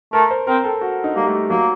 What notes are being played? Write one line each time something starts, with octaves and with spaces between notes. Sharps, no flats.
A3 A#4
C5
C4 A#4
A4
F#4
D#4
G3 A#3
A3
F#3 A#3